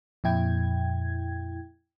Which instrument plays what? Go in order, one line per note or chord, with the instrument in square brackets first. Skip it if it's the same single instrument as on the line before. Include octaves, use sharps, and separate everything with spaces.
[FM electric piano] F2 A#2 E4 G5 G#6